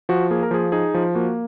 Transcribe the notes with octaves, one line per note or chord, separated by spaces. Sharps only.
F3 F#4
A#3 G#4
A#4
F3 G#4
D#4 G#4
F3
A#3 F#4